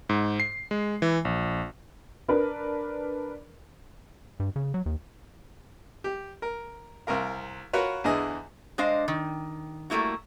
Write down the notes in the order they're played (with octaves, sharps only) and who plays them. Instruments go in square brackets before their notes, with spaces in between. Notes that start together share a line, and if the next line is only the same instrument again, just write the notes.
[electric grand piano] G#2
C7
G#3
E3
A#1
[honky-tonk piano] D4 A#4 B4
[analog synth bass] G2
C#3
F#3
D#2
[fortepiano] G4
A#4
C2 C4 A#4 F5
F4 F#4 A#4 B4 C#5
E2 D3 E3 G#4 D#5
[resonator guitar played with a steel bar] G#3 D4 C5 D#5 F5
D#3
G3 A3 A#3 E4 F#4